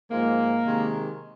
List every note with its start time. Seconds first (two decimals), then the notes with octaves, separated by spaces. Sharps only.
0.10 G#2 F3 G#3 A#3
0.64 C3 D#3 G#3